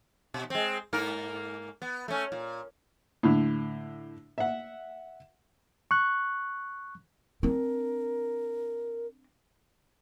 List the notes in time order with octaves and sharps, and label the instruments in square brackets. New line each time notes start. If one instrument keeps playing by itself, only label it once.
[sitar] B2
G#3 C4
G#2 A#3 A#4
B3
A3 C#4
A#2
[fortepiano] A2 D3
E5 F#5
[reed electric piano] C#6 F#6
[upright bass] C4 D4 [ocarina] A#4